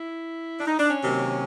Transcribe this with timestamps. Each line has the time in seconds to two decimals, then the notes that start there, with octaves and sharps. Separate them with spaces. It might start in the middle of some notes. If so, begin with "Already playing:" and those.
Already playing: E4
0.60 D4
0.66 D#4
0.79 D4
0.91 C#4
1.03 C3 D#3 F#3 A#3